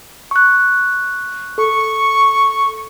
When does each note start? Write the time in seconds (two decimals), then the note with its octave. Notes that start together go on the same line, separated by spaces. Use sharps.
0.31 C#6 F#6
1.58 A4 C#6